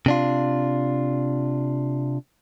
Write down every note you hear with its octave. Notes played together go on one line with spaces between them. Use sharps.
C3 D4 F4